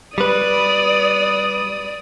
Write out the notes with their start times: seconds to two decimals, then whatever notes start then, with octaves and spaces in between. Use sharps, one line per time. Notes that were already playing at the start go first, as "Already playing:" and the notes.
0.18 G3 B4 D5 D#6